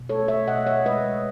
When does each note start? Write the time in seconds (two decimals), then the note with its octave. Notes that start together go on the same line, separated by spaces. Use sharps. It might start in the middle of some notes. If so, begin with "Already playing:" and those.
Already playing: B2
0.09 A3 A4 C#5
0.28 A3 C#5 E5
0.48 B2 D#5 F#5
0.66 B2 C#5 E5
0.85 G#3 B4 D#5
1.04 G#3